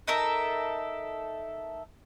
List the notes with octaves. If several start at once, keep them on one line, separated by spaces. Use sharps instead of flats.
D#4 A4 A#4 E5